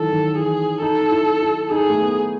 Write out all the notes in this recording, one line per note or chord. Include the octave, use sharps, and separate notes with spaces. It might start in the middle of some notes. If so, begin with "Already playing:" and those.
Already playing: D#3 E3 F#3 A4
D#3
E3 G#4
D#4 A4
D#4
E4
E4
D#4 G#4
A3
B3